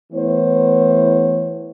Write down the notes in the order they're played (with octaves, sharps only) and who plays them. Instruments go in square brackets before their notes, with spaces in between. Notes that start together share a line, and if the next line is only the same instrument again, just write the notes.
[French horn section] E3 A3 B3 E4 C5 C#5